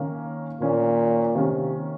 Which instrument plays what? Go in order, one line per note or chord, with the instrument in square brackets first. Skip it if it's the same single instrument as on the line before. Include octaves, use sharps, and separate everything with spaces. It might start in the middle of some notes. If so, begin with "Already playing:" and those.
Already playing: [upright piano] D#3 A#3 C#4
[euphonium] A#2 [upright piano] D#3 A#3 C#4
[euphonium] C3 [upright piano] D#3 A#3 C#4